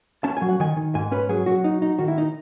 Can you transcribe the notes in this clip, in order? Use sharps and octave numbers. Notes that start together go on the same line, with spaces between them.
C#4 A5
G#5
F#3
F#5
D#3 G#5
D#3
G#2 G#5
C#4 B4
F#3 G#4
F#3 F#4
D#4
D#4
D#3 F#4
E4
D#4